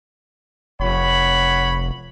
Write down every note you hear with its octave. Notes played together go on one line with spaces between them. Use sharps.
F1 C#5 F#5 B5